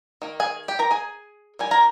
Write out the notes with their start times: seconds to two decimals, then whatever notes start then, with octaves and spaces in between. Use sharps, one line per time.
0.22 D#3 A#3
0.40 G#4 G#5
0.68 G4 G5
0.79 A#4 A#5
0.91 G#4 G#5
1.59 D#3 G3 G#5
1.71 A#4 A#5